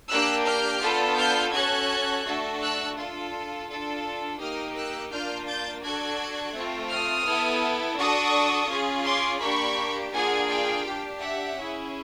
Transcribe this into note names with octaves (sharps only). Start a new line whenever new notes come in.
A#3 D4 G4 E6 F#6
F6 G6
B3 D4 F4 A4
F6 G6
C#4 F#4 A4 F#6 G#6
A3 D4 F#4 A4
E6 F#6
D4 F4 A4
D4 F4 A4
A#3 D#4 G4 D#6 F6
E6 F#6
A#3 D4 F4 F6 G6
G6 A6
D4 F#4 A4 F#6 G#6
A3 C4 F4
D#6 F6
B3 E4 A4
D4 F#4 A4 C#6 D#6
C#4 F4 G#4
C6 D6
A#3 D4 G4 B5 C#6
A#3 D4 F4 G#4 F#5 G#5
F5 G5
D4 G4
E5 F#5
C#4 E4 G#4